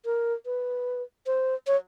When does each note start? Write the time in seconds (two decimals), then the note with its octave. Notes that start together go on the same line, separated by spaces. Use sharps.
0.05 A#4
0.46 B4
1.26 C5
1.67 C#5